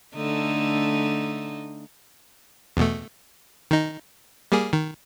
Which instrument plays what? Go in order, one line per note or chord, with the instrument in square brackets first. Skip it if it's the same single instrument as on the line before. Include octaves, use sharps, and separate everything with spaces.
[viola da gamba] D3 A3 D#4
[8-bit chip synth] E2 B2 A3
D#3 D#4
G3 A#3 G#4
D#3